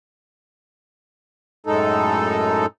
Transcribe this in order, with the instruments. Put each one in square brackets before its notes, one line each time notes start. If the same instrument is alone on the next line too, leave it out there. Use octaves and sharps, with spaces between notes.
[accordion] F#2 A2 G#3 D#4 A4